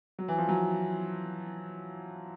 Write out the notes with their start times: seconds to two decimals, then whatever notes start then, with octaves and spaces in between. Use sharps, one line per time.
0.19 F#3
0.28 E3
0.38 F3
0.49 F#3